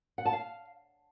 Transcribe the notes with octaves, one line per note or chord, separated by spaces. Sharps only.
F#5
A5
F5